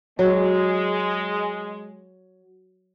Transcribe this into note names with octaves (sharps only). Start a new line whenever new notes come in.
F#3 G#3